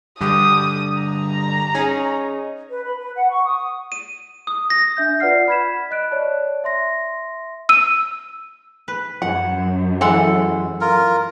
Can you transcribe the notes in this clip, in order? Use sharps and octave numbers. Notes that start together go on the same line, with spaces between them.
G2 D3 G4 D#6
A#5
C#4 D#4 G#4
B4
B5
B4
F#5
C#6
D#6
D#7
D#6
A#6
D4 E5 G6
F4 B4 D5 F#5 F6 C7
B5 F6 G#6 B6 E7
D#5 F#6 D7
C#5 D5 A5
E5 C6 A#6
E6 D#7
B4
F#2 F#5
E3 G#3 A4 F#5
F4 A#4